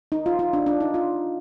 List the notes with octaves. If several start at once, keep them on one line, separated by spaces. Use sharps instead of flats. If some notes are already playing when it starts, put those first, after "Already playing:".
D#4
F4
F4
D4
D4
D#4
F4